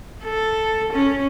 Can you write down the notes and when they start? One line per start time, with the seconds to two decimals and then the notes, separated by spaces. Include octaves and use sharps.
0.25 A4
0.93 C#4